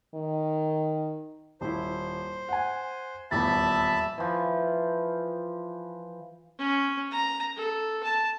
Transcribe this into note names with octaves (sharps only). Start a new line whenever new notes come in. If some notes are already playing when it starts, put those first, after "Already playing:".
D#3
D#1 E4 C5
F#5 G#5
D#1 E2 E5 A5 B5 A6
E3 F3
C#4
A#5
A4
A5